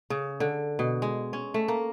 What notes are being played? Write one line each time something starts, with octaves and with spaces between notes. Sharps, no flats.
C#3
D3
B2
G#3
C#4
A3
A#3